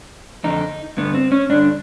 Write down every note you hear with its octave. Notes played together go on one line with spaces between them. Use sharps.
F2 D3 D#4
G2 D3 B3
C4
C#4
G2 D3 D4